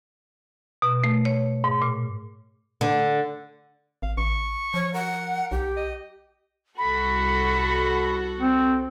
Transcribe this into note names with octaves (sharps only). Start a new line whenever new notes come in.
B2
A3
C#5
G#2
A#2
D3
G#1 F5
A1 C#6
F3 C#5
A#4 F#5
B1 G4
D#5
C2 F#4 A4 B5
C4